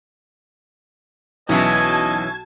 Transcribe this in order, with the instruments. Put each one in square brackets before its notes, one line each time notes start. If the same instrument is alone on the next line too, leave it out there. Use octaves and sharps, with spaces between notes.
[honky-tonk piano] B1 [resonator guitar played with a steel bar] B2 E3 C#4 [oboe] D#5 [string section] A5 G#6